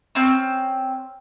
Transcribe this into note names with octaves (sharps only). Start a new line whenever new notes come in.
C4 C#4 E6